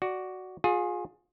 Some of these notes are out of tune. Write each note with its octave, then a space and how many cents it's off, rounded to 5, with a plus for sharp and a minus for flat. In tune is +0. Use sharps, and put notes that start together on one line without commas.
F#4 +5 D5 +0
F4 +35 G#4 +0